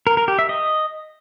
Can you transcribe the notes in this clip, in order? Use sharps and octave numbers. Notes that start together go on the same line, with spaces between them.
A#4
A#4
G4
E5
D#5